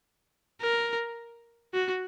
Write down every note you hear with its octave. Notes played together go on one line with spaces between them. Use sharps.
A#4
F#4